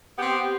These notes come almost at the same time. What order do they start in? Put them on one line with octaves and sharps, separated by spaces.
B3 G4 C4